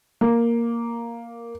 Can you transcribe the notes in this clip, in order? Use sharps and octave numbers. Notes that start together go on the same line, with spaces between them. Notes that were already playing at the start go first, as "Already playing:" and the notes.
A#3